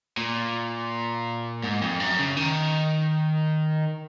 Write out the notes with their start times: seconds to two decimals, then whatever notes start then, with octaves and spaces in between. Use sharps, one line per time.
0.17 A#2
1.63 G#2
1.82 F2
2.00 F#2
2.19 C#3
2.37 D#3